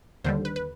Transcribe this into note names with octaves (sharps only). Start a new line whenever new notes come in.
D#2 D3 G3 C5
B4
B4